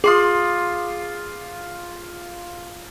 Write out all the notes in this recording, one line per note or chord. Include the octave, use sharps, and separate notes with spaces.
F4 G#4 C6 D6 D#6